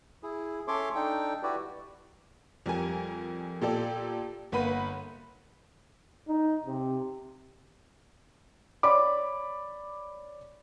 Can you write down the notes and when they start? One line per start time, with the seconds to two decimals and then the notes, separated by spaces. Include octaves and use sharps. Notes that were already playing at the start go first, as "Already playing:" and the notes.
0.23 E4 G#4
0.68 C#4 A4 C#5 E5 C6 D6
0.95 D4 D#4 A4 G5
1.43 E4 F#4 G4 B4 D5
2.66 F2 G3 A#4 G#5
3.61 A#2 G4 A4 D5
4.52 G1 A#3 B4 F#5 B5 D#7
6.28 D#4
6.66 C3
8.83 C#5 D5 B5 D6